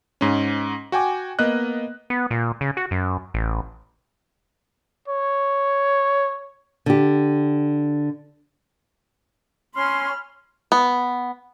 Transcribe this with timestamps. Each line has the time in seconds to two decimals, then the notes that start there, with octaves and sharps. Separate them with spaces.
0.21 G#2 C#4
0.92 F#4 G5 G#5 D6
1.39 A#3 B3 D#5 F#6
2.10 B3
2.31 A#2
2.61 C#3
2.77 F#4
2.91 F#2
3.34 A1
5.08 C#5
6.86 D3 G4
9.75 C#4 B5 C6 F6
10.72 B3